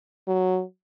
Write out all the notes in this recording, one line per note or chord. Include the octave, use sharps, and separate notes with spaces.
F#3